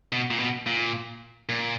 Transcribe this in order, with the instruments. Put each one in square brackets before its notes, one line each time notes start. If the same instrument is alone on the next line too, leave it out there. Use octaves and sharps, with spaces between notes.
[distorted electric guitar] B2
A#2
B2
A#2
A#2